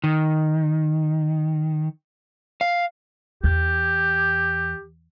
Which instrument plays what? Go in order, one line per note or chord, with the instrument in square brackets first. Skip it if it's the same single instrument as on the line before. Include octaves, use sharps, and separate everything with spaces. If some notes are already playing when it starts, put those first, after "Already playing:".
[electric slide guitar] D#3
F5
[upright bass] E2 [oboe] G4